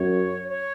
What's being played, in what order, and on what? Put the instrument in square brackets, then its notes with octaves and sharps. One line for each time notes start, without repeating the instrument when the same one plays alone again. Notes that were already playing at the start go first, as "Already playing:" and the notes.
Already playing: [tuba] F#2 [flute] C#5
[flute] C#5